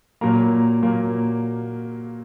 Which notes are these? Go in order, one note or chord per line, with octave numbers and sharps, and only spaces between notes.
A#2 F#3 A#3 A#5
A#2 F#3 A#3